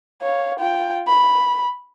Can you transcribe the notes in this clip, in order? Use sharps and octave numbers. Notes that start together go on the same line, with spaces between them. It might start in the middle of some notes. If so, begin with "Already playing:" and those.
C#5 F5
F4 G5
B5